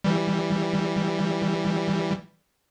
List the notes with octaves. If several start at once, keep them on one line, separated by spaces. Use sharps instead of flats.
E3 G3